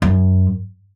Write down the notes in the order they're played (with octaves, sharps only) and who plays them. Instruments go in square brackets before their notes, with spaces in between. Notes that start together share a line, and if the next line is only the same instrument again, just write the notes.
[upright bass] F#2